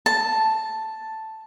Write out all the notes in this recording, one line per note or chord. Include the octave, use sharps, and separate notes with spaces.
A5